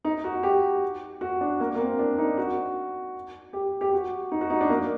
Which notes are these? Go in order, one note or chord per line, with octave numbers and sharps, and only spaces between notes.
D#4
F#4
G4
F#4
D4
A#3
A#3
C4
D4
D#4
F#4
G4
G4
F#4
D#4
F#4
D#4
D4
A#3